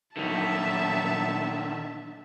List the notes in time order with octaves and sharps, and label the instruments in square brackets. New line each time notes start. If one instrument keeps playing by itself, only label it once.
[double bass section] A#2 F#3 B3 [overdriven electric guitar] D3 D#3 [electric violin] E5 A5